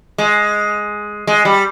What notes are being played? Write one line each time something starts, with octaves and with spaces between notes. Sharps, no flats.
G#3
G#3
G3